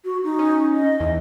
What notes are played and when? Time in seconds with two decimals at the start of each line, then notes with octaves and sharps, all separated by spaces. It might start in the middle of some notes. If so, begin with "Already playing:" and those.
0.05 F#4
0.24 D#4
0.39 C#4
0.74 D#5
1.00 E2